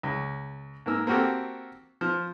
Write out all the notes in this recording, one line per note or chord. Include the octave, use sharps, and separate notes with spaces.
C#2
G#2 A#3 E6
A#3 C4 F#4 G4 A4
F3